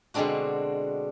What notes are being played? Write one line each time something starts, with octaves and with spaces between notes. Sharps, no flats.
B2 D3 G#3 C4 D4 F#4